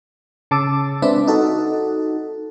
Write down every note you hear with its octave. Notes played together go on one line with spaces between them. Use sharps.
C#3 A5 D6 E6
G#3 C4 D4 B4 E5
D#4 F#4 A4